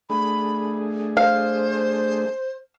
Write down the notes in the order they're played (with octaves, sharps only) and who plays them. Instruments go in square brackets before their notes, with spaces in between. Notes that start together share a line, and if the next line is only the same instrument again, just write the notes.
[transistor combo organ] A3 D4 G#4 [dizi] B5
[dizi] C5 [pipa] F5